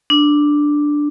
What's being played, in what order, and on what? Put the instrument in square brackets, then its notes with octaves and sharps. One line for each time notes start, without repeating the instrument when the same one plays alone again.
[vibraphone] D4